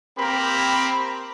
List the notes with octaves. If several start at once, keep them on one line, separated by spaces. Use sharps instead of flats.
A#3 C4 G4 A#4 B5